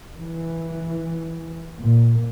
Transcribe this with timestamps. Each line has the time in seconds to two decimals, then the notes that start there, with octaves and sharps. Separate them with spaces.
0.18 E3
1.79 A#2